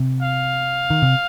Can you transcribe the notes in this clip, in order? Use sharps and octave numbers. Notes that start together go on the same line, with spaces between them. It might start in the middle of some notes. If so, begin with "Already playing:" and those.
Already playing: C3
F5
D#3
C3